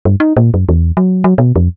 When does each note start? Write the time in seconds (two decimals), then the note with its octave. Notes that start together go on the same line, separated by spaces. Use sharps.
0.05 G2
0.20 D#4
0.37 A#2
0.54 F#2
0.69 E2
0.97 F#3
1.24 F#3
1.38 B2
1.56 F2